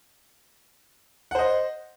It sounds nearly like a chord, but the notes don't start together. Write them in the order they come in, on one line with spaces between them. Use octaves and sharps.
F#5 C5 D#5